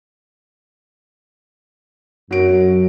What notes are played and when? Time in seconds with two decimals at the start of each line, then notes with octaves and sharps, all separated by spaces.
2.31 F#2 F#3 D7